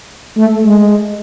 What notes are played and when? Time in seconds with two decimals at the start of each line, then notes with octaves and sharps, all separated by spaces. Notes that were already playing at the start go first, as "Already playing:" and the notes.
0.37 A3
0.65 G#3